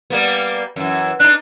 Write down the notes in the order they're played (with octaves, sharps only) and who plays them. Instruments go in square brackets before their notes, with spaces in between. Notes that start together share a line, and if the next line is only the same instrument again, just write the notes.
[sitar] G3 A#3 B3
F#2 E3
[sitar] D4 D#4 [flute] F#6